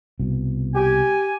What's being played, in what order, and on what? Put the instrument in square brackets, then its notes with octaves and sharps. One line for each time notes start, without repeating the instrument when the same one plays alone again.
[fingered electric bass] C2 B2
[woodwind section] G4 G#5